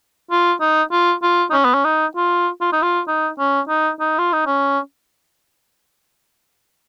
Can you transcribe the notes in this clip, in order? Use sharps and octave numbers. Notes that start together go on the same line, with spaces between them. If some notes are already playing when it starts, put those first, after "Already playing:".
F4
D#4
F4
F4
D#4
C#4
B3
C#4
D#4
F4
F4
D#4
F4
D#4
C#4
D#4
D#4
F4
D#4
C#4